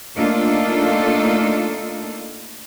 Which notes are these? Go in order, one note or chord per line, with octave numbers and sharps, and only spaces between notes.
A3 A#3 D4 D#4 F4 A4